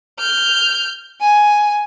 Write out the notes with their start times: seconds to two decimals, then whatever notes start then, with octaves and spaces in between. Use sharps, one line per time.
0.19 F6 G6
1.21 G#5